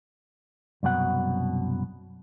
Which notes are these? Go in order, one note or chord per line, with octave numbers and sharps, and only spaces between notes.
C2 F#2 B2 F#5